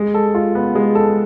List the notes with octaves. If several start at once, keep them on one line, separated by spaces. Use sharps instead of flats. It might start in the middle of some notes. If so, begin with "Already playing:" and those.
Already playing: G#3
A4
F4
B3
G#3
A4